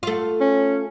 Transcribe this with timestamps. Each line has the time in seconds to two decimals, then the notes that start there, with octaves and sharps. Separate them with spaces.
0.03 A3 F4
0.41 C#4